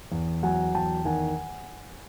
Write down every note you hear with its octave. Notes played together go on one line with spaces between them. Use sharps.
E2
F#3 F#5 G#5
E2 G5 A5
D#3 F#5 G#5